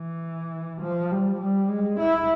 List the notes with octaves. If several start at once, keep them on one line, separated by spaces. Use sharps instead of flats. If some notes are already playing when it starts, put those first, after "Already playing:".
Already playing: E3
F3
G3
G3
G#3
E4